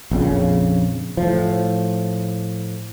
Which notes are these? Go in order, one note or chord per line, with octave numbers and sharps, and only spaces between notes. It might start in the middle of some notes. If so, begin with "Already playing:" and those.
A#1 F2 C#3
A2 F3